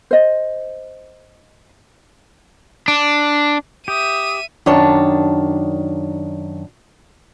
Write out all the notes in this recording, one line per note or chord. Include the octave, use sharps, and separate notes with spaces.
C5 D#5
D4
G4 E5 D#6 D#7
F#2 D#3 D4 C#5 A5